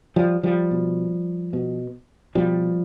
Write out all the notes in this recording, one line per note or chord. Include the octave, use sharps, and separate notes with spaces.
F3 G3
F3 G3
B2
B2
B2 F3 G3